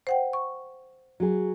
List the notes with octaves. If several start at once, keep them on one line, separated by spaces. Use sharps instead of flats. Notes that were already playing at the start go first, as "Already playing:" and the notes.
C5 F#5 G5
C#6
F#3 G#4